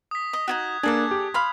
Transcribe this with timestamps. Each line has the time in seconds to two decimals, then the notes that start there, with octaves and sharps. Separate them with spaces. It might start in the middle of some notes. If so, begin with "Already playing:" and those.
0.11 D#6 B6
0.33 D#5
0.48 D#4 F4 F#4 F#6 G#6
0.83 A#3 D4 G#4 A4 D5 G#6
1.11 G4
1.34 F5 B5 C6 F6